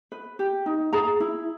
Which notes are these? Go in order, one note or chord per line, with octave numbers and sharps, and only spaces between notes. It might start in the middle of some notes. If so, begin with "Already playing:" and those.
B4
G4
D#4
G#4 A#5
E4